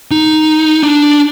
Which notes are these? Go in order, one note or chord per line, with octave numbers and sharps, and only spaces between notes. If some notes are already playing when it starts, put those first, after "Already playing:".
D#4
D4